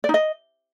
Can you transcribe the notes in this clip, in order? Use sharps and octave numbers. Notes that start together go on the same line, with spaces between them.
D5
D#4
D#5